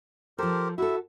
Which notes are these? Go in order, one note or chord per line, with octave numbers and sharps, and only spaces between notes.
F3 G4 A4 A#4 C5
E4 F#4 A4 E5